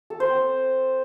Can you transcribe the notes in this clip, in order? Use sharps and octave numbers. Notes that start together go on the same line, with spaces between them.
A4
C5
C4